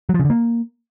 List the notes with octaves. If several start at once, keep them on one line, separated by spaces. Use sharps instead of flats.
F#3
F3
C#3
D3
A#3